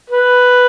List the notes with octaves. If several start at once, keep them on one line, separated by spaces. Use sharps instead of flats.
B4